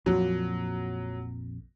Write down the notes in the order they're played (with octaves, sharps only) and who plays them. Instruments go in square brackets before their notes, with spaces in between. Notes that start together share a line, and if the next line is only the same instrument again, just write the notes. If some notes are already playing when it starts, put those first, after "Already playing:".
[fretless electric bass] A#1 F2 A#2 [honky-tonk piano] F#3